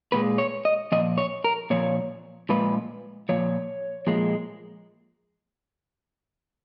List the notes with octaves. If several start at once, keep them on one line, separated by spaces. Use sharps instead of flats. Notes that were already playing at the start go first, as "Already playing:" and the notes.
A#2 F3 G#3 B4
C#5
D#5
A#2 F3 D#5
C#5
A#4
A#2 F3 C#5
A#2 F3 G#3 B4
A#2 F3 C#5
A#2 F3 G#3